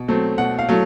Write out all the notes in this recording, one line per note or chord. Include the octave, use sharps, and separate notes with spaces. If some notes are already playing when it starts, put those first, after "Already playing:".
Already playing: B2
F#3 A3 C4
B2 F#5
F5
F#3 A3